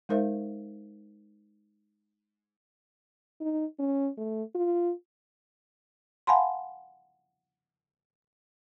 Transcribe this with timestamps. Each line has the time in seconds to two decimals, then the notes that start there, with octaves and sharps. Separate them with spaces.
0.09 G#3 D#4 A#4 C5 E5 F5
3.41 D#4
3.79 C#4
4.18 A3
4.55 F4
6.27 F5 F#5 G#5 A5 B5 C6